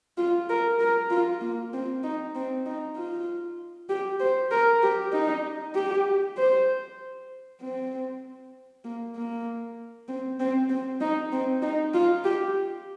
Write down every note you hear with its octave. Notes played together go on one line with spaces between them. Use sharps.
F4
A#4
A#4
F4
A#3
C4
D#4
C4
D#4
F4
G4
C5
A#4
G4
D#4
G4
C5
C4
A#3
A#3
C4
C4
C4
D#4
C4
D#4
F4
G4